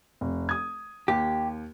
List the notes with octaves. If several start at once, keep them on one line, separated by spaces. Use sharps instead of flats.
F1
D#6 G#6
D#2 G4